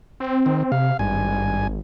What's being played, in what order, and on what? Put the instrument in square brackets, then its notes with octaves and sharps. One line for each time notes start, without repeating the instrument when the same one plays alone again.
[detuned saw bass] C4
[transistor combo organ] D#3
[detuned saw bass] C3 [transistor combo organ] F5
[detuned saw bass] G#1 [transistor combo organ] G2 G#5